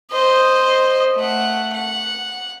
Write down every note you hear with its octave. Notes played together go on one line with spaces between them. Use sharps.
C5 D#5
A3 F#5
F#5